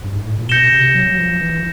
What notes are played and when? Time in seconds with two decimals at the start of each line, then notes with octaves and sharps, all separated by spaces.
0.04 G2
0.15 G#2
0.26 A2
0.38 A#2
0.49 B2 G6 A#6 C#7 E7 G7
0.72 C3
0.95 F#3
1.11 F#3
1.18 F3
1.41 E3